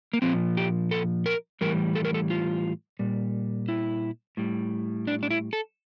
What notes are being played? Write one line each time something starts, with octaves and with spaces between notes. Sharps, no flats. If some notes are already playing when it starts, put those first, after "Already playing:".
A#3
A#2 F3 C4
G4
A4
A#4
A2 E3 G3 A#4
A4
A#4
A4
F4
A#2 G3
E4
A2 G3
D4
D4
E4
A4